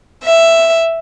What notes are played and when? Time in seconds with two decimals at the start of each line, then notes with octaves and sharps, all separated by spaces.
0.24 E5